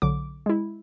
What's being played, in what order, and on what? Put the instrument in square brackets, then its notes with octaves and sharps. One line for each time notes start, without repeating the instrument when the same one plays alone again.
[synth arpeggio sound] B1 D3 F#3 D6
G#3 E4